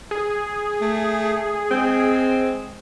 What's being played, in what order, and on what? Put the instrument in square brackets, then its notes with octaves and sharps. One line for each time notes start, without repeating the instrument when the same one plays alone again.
[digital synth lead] G#4
[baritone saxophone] A3
[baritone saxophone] G#3 [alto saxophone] C4